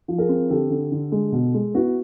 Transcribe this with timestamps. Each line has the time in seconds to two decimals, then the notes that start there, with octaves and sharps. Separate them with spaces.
0.08 F3
0.18 G#4 A#4
0.29 C4
0.50 D3 G4 A4
0.70 D3
0.92 D3
1.12 G#3
1.32 B2
1.54 G#3
1.74 B3 E4 F#4